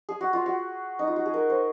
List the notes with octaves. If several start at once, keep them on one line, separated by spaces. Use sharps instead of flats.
G#4
F#4
F4
F#4
D#4
F4
F#4
G#4
A#4
C5